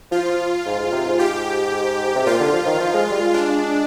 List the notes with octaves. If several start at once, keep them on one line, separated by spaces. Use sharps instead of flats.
F3 F4
G#2
G#2
C3
G#2
G4
C3
A#2 F4
D3
F3
D#3
F3
G#3
G3
G#3
D4